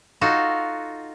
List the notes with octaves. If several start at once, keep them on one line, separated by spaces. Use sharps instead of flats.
D#4 F4 F#4 A4